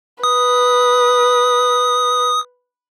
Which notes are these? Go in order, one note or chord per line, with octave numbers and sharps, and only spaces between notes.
B4 D#6